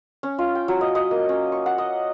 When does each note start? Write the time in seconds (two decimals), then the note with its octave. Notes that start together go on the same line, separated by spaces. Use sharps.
0.23 C#4
0.39 F4
0.55 G5
0.68 F#3
0.81 D#5
0.95 D#5
1.11 A#3
1.29 C#4
1.52 C#6
1.66 F#5
1.78 D#5